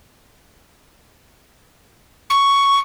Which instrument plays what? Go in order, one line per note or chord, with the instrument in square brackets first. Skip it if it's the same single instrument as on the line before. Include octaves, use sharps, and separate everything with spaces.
[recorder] C#6